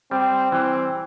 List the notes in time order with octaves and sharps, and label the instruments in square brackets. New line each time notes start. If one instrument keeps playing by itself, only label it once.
[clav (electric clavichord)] G3 [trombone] C4
[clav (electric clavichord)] E3 [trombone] C4